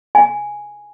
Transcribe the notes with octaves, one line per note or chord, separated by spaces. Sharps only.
G#5